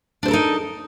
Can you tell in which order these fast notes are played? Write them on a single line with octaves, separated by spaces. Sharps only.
D4 C5 A4 A#4 D#4